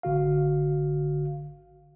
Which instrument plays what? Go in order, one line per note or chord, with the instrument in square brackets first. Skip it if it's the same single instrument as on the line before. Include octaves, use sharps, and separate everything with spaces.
[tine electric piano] G#1 D3 F#4 F5